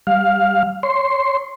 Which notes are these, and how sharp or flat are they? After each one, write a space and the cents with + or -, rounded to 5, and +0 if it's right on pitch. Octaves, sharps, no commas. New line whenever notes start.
G3 +5 F5 +10
C#5 +0 C6 +0